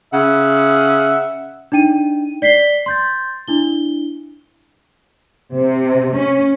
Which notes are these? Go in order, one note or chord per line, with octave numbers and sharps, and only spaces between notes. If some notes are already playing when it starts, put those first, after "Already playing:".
C#3 E5 F#5
D4 D#4 G5 D#7
D5 B6 C7 G7
C6 G6 A6
D4 E4 G7
C3
C#4